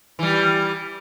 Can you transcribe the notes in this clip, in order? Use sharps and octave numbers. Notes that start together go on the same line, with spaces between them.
E3 G3